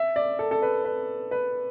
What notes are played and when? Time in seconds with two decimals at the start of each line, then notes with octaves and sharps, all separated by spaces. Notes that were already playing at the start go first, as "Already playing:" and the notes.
Already playing: E5
0.16 D5
0.39 A4
0.51 A4
0.62 B4
0.84 B4
1.31 B4